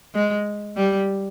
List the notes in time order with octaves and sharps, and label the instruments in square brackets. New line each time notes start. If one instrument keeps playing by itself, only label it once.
[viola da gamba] G#3
G3